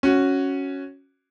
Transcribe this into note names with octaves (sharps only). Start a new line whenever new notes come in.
C#4 F#4